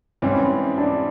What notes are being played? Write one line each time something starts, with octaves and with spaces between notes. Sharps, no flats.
G#2 E3 G3 C4 C#4
D4